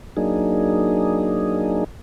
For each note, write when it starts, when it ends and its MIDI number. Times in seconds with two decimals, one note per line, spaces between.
0.17 1.84 54
0.17 1.84 58
0.17 1.84 62
0.17 1.84 63
0.17 1.84 68